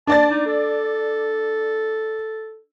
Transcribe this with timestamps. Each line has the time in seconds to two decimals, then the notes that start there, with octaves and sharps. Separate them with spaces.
0.07 D4 D5 A5 A6
0.31 D#4
0.46 A4